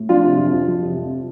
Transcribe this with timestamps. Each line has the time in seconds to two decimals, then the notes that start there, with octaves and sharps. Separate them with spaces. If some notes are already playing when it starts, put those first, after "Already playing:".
Already playing: A2
0.09 F3 D4 F4
0.23 C3
0.38 F2
0.53 F2
0.67 F3
0.82 C3
0.96 F2